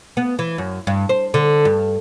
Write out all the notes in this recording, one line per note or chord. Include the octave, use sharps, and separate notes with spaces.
B3
E3
F#2
G2
C5
D3
G2